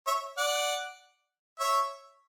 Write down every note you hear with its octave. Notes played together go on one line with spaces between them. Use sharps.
C#5 E5
D5 F#5
C#5 E5